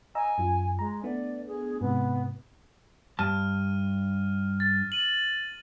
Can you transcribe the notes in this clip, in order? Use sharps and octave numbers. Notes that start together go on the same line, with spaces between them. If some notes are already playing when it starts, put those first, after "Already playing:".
D#5 G#5 A#5 E6
F#2 F4
G#3 A#5
A3 B3 D4 D5
G#4
G#2 C3 B3
G2 A5 F6 D#7
A6
D#7 F#7